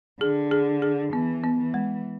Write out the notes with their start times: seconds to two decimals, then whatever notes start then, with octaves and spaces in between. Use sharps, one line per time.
0.21 D3 G#4
0.51 G#4
0.82 G#4
1.13 E3 B3
1.44 B3
1.59 E3
1.74 G#3